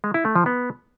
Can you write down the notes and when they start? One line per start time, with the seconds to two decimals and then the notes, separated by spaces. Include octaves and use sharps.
0.04 G#3
0.14 E4
0.25 A3
0.36 F3
0.46 B3